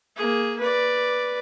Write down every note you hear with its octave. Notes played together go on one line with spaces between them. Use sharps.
A#3 G#4
B4 D5